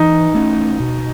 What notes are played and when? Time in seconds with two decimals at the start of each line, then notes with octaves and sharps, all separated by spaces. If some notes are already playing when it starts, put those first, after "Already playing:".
Already playing: E3 D#4
0.34 A3 C#4
0.80 B2